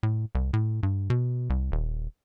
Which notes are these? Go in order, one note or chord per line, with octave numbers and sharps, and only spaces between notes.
A2
C2
A2
G2
B2
C2
D#1